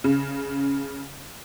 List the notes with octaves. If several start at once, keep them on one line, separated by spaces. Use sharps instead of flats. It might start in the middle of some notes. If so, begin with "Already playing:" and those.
C#3